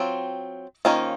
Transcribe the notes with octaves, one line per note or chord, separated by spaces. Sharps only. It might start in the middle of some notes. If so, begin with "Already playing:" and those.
Already playing: F#3 C4 F4
D#3 A#3 C#4 F4 C5